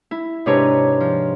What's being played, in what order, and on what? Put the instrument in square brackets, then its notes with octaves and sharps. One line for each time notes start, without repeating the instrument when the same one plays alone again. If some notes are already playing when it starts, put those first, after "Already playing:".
[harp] E4
G#2 C3 D4 B4 C#5 A#5
F3